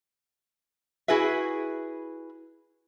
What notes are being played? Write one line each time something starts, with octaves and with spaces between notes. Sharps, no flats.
E4 F#4 G#4 B4 E5